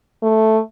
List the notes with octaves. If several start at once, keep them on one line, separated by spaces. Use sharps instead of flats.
A3